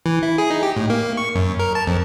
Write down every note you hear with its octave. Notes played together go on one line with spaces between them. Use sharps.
E3
E4
G#4
D#4
G4
A2
A#3
C#6
F#2
A#4
A5
F2